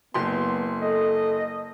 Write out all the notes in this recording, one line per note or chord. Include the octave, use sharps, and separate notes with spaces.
F#1 B3 C6
A4 D#5